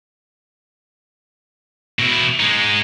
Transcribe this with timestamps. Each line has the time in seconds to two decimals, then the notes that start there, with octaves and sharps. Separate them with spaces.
1.99 B2 E4
2.40 G#3 D#4